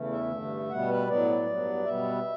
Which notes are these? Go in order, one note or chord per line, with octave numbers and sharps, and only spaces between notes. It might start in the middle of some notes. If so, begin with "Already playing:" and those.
Already playing: E2 C#3 E3 A3
E5
G2 D3 A3
B2 G3 B3 F#5
B4
A2 F#3 B3 D5
G2 F#3 B3
B2 G3 B3 E5